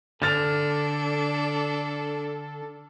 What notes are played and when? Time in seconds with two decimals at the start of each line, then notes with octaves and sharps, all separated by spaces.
0.22 D3 D4 A4 F6 A6 F7